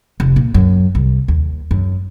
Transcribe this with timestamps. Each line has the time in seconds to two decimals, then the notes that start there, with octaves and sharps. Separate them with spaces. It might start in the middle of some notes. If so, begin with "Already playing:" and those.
0.20 F1
0.36 A#2
0.54 F#2
0.95 C2
1.28 D#2
1.71 F#2